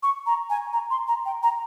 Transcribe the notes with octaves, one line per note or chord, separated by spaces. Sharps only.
C#6
A#5
G#5
A#5
C6
A#5
G5
A#5